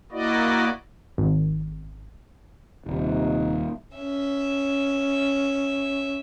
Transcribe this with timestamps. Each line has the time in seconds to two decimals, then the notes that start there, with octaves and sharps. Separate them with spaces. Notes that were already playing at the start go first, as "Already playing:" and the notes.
0.12 A#3 E4 F#4 D5 D#5
1.18 G#1
2.86 D#1 C3 D#4
3.95 C#4 E5